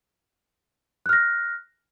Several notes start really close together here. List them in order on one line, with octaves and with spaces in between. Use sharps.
F#6 F6 A#6